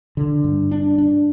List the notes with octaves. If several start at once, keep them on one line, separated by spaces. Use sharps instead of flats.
D3
G2
D4
D4